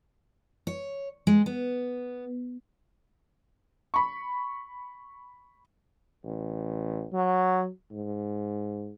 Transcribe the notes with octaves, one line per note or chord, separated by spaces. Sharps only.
C#5
G#3
B3
B5 C#6
A1
F#3
G#2